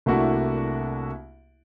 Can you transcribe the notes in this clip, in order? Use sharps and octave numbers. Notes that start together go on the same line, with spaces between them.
C2 A3 A#3 D4 E4 F#4